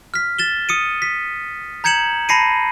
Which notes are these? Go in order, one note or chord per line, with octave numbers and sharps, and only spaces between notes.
F6 B6
A6 E7 G7
D#6 C#7 D#7
B6
A#5 G6 G#6 C#7 E7 F#7
A5 B5 A#6 C7 C#7 D#7